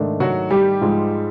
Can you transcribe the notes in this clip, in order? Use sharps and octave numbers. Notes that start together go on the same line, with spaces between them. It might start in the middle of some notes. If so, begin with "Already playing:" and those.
Already playing: G#2 D#3 A3 D4
F#3 F#4
G3 G4
G#2 F3 G#3